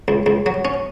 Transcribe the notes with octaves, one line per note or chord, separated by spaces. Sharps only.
C#2
C#2
F#3
C#4